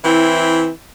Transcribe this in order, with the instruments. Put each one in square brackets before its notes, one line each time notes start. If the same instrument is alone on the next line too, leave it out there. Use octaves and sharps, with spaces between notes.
[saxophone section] E3 C4 E4